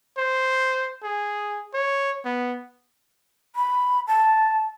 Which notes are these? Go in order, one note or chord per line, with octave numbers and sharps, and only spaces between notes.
C5
G#4
C#5
B3
B5
A5